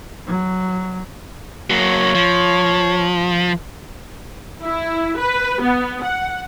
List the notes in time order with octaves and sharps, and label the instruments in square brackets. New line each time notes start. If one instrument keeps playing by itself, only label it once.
[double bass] F#3
[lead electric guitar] F#3 A#3 [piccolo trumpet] C#5
[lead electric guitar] F3
[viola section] E4
B4
B3
F#5